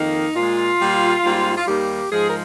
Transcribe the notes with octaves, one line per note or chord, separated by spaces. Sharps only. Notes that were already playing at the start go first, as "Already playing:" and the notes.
Already playing: F2 D#3 A#3 D#4
A#2 G#3 F4
A#2 G3 A#3
G#2 G3 A#3
F4
D#2 D#3 G3 A#3 G4
G#2 F3 G#3 G#4
A#4